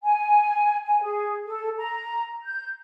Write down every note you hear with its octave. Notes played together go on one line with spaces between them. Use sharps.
G#5
G#5
G#4
A4
A#5
G6